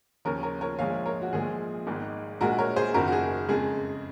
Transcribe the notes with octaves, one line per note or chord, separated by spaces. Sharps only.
D#2 C#3 F3 A#4 C#5
A#4 C#5
A#4 C#5
A#1 A#2 F3 G#3 C#5 F5
A#4 C#5
F#4
A#1 A#2 F3 G#3 G#4
G#1 G#2 D#3 G#3
A#1 A#2 G#3 F#4 A#4
A#4 C#5
G#4 C5
F#1 F#2 D#3 F#4 A#4
F#4
G#4
F2 C#3 G#3 G#4